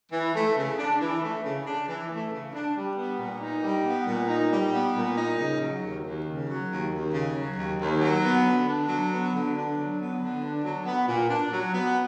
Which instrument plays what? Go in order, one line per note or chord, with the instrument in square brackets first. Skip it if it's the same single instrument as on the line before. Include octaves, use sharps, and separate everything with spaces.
[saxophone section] E3
A3
C#3
D4
E3
A3
C#3
D4
E3
A3
C#3
D4
G3
B3
A#2
D#4
G3
B3
A#2
D#4
G3
B3
A#2
D#4
C#3
F#3
D#2
D#2
C#3
F#3
D#2
D#2
C#3
F#3
D#2
D#2
F#3
B3
D3
D4
F#3
B3
D3
D4
F#3
B3
D3
D4
F#3
B3
A#2
D4
F#3
B3